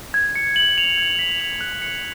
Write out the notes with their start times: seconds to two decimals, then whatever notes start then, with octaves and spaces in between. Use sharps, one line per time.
0.14 G#6
0.35 C#7
0.56 F#7
0.78 F7
0.98 G#6
1.19 B6
1.40 F7
1.61 F#6
1.82 C#7